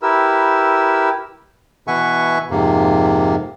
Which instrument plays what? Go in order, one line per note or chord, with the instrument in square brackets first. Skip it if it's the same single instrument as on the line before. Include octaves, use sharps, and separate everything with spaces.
[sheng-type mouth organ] E4 G4 A#4 B4 E6
[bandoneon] B2 E3 E5 F#5 G#5 C#6
F2 G#2 C3 A#3